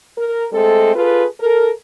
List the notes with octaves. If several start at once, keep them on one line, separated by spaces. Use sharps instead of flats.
A#4
G#3 A3 C4 A4
F4 G#4 A4 B4
A4 A#4